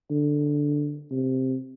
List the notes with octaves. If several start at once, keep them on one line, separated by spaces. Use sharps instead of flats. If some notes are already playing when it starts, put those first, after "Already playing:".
D3
C3